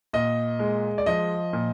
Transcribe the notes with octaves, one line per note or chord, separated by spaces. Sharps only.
A#2 D#5
G#3
D5
F3 D#5
A#2